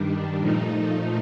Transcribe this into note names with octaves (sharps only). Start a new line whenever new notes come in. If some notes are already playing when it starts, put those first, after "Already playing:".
Already playing: G2 D#3 G3 D4
A#2 F3 A3 D#4